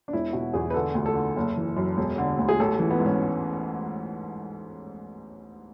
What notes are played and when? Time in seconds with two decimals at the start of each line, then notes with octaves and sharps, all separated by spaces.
0.08 D4
0.13 E1 E4
0.33 B2 F#4
0.54 E2 G#4
0.70 B4
0.74 D3 A4
0.95 D2
1.06 A4
1.15 D3
1.36 F#1
1.57 E3
1.77 F#2
1.97 E1
2.18 D3
2.39 D2
2.48 G#4
2.60 A1 A4
2.79 E3
2.90 B3
3.00 G#2
3.06 C#4